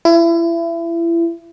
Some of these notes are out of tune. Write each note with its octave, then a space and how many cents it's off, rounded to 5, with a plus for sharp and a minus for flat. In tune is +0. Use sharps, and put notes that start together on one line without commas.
E4 +30